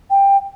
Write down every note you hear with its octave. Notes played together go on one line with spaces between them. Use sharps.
G5